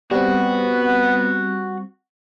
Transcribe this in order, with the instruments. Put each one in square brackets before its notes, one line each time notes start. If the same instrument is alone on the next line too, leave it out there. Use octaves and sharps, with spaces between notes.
[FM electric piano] G3 C4 [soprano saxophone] B3 [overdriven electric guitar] F#4